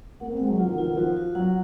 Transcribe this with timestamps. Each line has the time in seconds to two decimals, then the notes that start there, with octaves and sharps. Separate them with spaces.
0.20 A#3 F#5
0.31 C4
0.40 G#3 F#5
0.49 F#3
0.59 F3 F4
0.68 D#3
0.78 F3 F4
0.87 D#3
0.97 F3 F#4
1.17 F#4
1.35 F#3 F#5